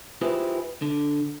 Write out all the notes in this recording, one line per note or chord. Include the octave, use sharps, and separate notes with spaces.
E4 F4 G4 G#4 B4 C5
D3